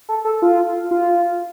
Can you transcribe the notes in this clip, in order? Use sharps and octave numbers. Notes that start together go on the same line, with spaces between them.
A4
A4
F4
F4